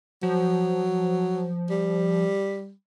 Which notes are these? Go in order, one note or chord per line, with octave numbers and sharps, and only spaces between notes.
F3 F#3
G3